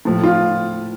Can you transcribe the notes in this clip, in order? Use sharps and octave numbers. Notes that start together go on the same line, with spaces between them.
A2 F3
F4